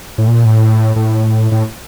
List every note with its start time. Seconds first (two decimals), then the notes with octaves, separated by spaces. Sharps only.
0.18 A2
0.28 A#2
0.45 A2
0.96 A2
1.52 A2